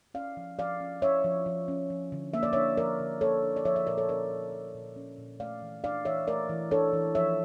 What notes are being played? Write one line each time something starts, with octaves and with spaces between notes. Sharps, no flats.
C#4 D5 F5
F3
F3 D5 F5
C#4
C#4 C#5 E5
F3
F3
C#4
F3
D3
A#3 E5
D5
D4 C#5 E5
F3 A#4 D5
D3
A#3 A4 C#5
D4
D5
F3 C#5 E5
C#5 E5
A#2 A#4 D5
A4 C#5
C#4 A#4 D5
A#2
F3
A#2
C#4
A#2
A3 D5 F5
E3
D4 D5 F5
E3 C#5 E5
A3 A#4 D5
E3
D4 A4 C#5
E3
F3 C#5 E5